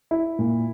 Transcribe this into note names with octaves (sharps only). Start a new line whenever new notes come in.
E4
A#2